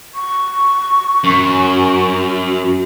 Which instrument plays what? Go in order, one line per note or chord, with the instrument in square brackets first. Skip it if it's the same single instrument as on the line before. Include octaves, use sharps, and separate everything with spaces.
[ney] C#6
[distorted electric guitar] F#2